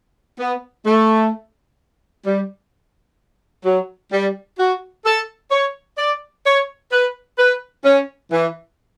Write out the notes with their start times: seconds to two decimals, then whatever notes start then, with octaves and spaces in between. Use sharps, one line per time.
0.39 B3
0.86 A3
2.26 G3
3.65 F#3
4.12 G3
4.58 F#4
5.05 A4
5.51 C#5
5.98 D5
6.46 C#5
6.92 B4
7.38 B4
7.85 C#4
8.32 E3